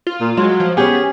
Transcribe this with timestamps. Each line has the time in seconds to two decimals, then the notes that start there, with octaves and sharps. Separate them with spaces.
0.07 F4
0.21 A#2
0.37 F#3 G#3 F4
0.60 F3
0.77 B3 C#4 G4 G#4